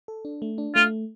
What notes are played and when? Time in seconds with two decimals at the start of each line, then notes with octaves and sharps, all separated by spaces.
0.08 A4
0.25 D4
0.42 A3
0.58 D4
0.75 A3 F4